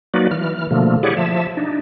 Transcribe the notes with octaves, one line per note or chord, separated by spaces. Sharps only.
F#3 A#3 D#4 F#4 B4 D5
E3 F6
B2 D3 F3 A3 A#3
E4 G4 G#4 C#5 D5 F#5
F3 E5 A5
D4 D#4